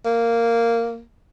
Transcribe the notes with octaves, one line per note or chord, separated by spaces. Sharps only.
A#3